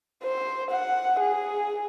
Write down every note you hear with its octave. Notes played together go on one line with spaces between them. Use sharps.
C5
F#5
G#4